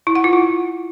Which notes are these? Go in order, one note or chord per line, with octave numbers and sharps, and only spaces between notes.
E4
F#5
F4
E4